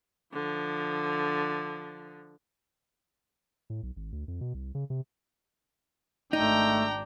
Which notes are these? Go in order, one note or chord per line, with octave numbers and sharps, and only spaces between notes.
D3 F3
A2
B1
G#1
D2
F2
B2
C2
C#3
C3
G#1 A3 D4 D#4 G5 A#5